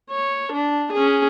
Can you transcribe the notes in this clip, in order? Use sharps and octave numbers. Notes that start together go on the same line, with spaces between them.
C#5
D4
C#4 G#4